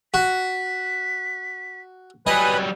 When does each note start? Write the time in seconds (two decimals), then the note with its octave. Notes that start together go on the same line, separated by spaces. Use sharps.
0.14 F#4 B6
2.27 F#3 G3 B4 D#5 G#5 B5